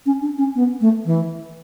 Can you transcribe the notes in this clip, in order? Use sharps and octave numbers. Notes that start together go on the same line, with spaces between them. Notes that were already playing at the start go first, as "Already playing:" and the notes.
C#4
D4
C#4
B3
A3
E3